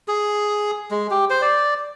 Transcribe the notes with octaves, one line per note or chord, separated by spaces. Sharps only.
G#4
G#3
G4
C5
D5